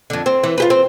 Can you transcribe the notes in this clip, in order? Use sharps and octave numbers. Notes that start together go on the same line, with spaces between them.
F2 D3
C4
E3
F4 G4 B4
C4